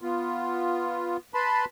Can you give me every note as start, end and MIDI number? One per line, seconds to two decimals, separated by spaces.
0.02 1.17 59
0.02 1.17 65
1.34 1.65 71
1.34 1.65 81
1.34 1.65 83
1.34 1.65 84